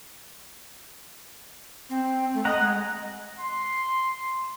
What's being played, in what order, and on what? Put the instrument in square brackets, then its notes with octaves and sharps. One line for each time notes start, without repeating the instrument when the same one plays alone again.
[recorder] C4
A3
[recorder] D#5 [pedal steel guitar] F#5 A#5
[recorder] G#3
[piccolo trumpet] C6